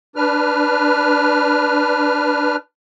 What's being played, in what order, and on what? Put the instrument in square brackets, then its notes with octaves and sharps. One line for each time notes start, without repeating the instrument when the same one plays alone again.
[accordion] D4 B4 F6